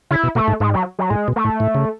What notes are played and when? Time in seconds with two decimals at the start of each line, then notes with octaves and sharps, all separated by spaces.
0.11 C#3 E4
0.23 B2
0.35 B2 A3
0.48 G#2
0.60 G#2 G#3
0.74 F#3
0.99 F#3
1.10 A2 G#3
1.28 B2
1.36 A3
1.45 A2
1.60 A2
1.75 C#3